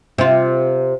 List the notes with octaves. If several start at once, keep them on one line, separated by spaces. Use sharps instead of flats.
C3 F4